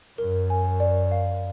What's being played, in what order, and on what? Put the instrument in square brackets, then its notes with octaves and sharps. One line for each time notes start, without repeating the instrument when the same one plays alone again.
[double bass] F#2 [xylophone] A#4
[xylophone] G#5
D5
F5